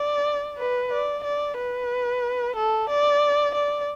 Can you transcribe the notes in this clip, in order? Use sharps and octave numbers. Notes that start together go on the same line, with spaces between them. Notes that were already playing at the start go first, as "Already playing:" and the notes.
Already playing: D5
B4
D5
D5
B4
A4
D5
D5